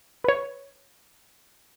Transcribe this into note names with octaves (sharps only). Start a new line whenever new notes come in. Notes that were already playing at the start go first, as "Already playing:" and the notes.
B4 C#5